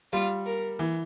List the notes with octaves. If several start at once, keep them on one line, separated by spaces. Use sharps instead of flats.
G3 F4
A#4
E3